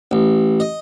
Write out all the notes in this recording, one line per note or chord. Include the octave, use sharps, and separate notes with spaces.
A1
D#5